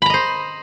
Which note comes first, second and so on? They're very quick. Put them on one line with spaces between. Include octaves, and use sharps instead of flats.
B5 A#5 D#5 C5